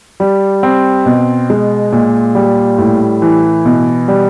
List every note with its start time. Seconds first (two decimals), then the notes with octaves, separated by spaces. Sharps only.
0.20 G3
0.63 C4
1.06 B2
1.50 G#3
1.92 A#2
2.35 G3
2.78 A2
3.22 E3
3.65 B2
4.08 G3